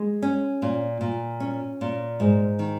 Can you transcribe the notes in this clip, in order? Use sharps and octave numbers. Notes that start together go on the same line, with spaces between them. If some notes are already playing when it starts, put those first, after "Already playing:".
Already playing: G#3
C#4
A#2
A#2
C#4
A#2
G#2
D#3